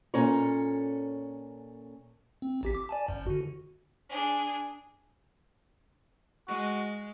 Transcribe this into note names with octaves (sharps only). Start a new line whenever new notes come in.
A#2 C#4 A4 C#5 A#5
C4
A1 G4 B6
D6
D5 G#5 A5
G1 F#2
D3 F#4
D4 G#4
G#3 F#4